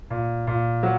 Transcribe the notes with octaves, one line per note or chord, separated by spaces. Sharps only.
A#2
A#2
F#3